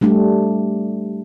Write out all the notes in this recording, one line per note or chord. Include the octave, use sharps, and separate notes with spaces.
G3 A3 D4 G4